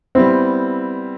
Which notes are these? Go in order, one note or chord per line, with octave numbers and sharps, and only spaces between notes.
G3 B3 C4 E4